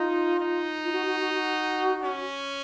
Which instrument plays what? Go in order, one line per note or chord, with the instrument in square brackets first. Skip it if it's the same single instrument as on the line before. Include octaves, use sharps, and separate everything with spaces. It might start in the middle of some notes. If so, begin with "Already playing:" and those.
Already playing: [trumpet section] D#4 [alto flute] F4
[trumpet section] D#4
[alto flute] F4
F#4
F#4
F#4
F#4
[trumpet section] C#4